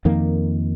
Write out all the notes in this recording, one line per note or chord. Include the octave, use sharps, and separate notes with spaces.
F2 D#3 A#3